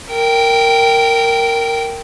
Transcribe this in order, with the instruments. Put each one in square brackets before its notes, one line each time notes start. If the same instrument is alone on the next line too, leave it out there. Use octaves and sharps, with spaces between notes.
[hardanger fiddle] A#4 G5